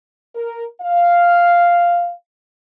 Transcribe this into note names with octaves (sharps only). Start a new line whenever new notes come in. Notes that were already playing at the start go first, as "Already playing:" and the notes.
A#4
F5